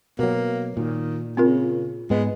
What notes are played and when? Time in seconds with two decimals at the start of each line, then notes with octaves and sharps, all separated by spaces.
0.19 B2 F#3 A#3
0.77 A#2 D#3
1.37 C#3 C4 F4 A#4
2.10 G#2 G#3 B3